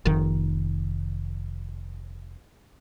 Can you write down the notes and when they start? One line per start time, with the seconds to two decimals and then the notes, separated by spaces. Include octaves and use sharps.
0.05 F1 D#3